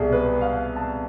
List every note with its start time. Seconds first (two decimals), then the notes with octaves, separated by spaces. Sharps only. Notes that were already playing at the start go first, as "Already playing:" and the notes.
Already playing: C2 B2 G#4 A4
0.12 B4
0.41 F5
0.76 A5